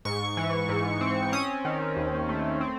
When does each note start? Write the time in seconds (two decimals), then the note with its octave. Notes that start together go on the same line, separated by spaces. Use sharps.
0.05 G#2 C#6
0.37 E3
0.69 G#2
1.01 C4
1.33 C#4 D#6
1.65 D#3
1.96 D#2
2.29 A3
2.61 C4